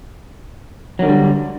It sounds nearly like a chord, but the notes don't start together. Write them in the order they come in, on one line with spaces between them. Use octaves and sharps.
F#3 D#3 D3 G3